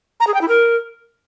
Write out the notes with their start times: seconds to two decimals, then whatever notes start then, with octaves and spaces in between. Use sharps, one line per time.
0.20 A#5
0.27 G#4
0.34 G5
0.41 E4
0.48 A#4